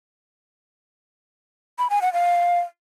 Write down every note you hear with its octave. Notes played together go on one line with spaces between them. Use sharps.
B5
G#5
F#5
F5